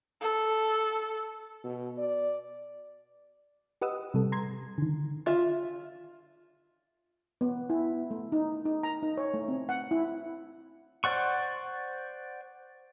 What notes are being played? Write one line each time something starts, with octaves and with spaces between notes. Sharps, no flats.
A4
B2
D5
G4 B4 D#5 F#5 D#6 E6
C3 G3 A4
A#5 C6 G#6
D3 D#3
F4 E5
B3
E4
A3
D#4
D#4
A#5
D#4
C#5
A3
C4
F#5
E4
C5 D5 F#5 C#6